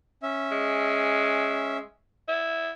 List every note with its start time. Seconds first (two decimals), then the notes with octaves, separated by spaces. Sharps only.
0.23 C#4 E5
0.52 G#3
2.28 E4